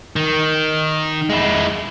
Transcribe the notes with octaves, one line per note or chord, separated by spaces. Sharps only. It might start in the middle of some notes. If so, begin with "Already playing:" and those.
D#3
G#3 E4